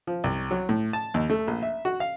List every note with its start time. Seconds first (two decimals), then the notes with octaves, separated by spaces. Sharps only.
0.07 F3
0.24 C2
0.51 F#3
0.69 A2
0.93 A5
1.14 D#2
1.30 A3
1.47 A#1
1.63 E5
1.85 F#4
2.00 F5